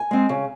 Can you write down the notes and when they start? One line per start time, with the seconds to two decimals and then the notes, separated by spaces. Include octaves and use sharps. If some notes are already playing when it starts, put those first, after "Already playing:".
Already playing: G#5
0.11 G#3 C4
0.29 C#3